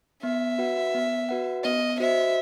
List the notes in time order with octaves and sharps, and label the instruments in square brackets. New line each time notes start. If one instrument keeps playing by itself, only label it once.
[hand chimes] B3 [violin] E5
[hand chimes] F#4 B4 F#5
B3
F#4 B4 F#5
[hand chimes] B3 [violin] D#5
[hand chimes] F#4 C5 D#5 [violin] E5